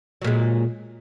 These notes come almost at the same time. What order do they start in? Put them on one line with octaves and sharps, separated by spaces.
F#3 A#2 G#3